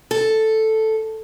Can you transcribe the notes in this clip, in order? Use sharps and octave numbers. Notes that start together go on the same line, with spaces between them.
A4